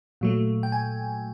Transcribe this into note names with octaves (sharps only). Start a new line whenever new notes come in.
A#2 F#3 A3
G5
G#5